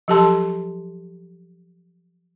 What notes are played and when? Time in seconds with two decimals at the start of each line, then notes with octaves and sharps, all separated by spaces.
0.08 F3 F#3 G4 A4 A5 C6